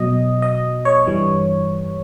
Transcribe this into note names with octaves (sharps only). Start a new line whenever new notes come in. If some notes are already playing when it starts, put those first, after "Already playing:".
Already playing: B2 F#3 D#5
D#5
C#5
G2 E3 G3